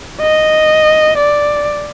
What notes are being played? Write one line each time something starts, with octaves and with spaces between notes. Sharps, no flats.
D#5
D5